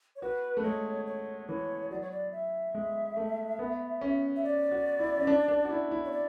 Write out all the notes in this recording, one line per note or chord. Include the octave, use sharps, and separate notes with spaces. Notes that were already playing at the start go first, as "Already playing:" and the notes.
C#5
F#4 B4
A3
G#3 C#5
C#5
E3 C#5
F#3 D5
C#5
D5
E5
G#3
A3
B3
C#4
E5
D5
F#4
E4
C#4
D4
D4
F#4
E4
E4
C#5
D5